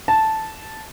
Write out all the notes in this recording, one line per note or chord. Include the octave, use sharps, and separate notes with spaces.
A5